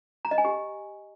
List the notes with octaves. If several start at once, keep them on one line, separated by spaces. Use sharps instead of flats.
A#5
D#5
G#5
G4